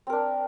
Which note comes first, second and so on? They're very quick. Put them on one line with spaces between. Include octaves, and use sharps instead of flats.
C4 A#4 D4